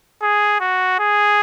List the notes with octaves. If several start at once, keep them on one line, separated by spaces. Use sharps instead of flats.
G#4
F#4
G#4